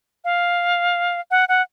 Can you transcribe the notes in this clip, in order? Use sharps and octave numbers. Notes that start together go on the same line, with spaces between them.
F5
F#5
F#5